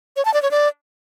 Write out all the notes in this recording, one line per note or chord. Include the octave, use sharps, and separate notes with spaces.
C#5
A5
D5
C#5
D5